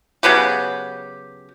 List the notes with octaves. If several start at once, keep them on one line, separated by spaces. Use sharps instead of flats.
C#3 F#3 B3 G4